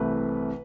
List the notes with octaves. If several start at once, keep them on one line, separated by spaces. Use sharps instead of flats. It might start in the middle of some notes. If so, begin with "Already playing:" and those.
Already playing: C2 C3 E3 A3 B4